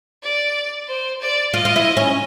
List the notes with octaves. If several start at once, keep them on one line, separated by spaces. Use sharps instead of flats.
D5
C5
D5
F4 D#5
F4
E4
C#4